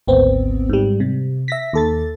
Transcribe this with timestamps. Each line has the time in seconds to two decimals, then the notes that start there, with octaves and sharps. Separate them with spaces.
0.07 G#1 D2 B3 C4
0.69 G#2 G3
1.00 C3
1.48 E5 A#6 B6
1.73 D#2 A4 A6